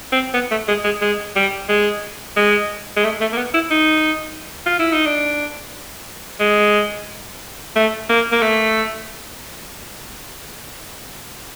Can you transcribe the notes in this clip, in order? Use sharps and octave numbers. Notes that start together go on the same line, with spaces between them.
C4
B3
A3
G#3
G#3
G#3
G3
G#3
G#3
G#3
A3
A3
A#3
B3
E4
D#4
F4
E4
D#4
D4
G#3
A3
A#3
A#3
A3